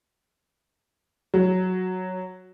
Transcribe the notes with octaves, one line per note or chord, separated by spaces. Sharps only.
F#3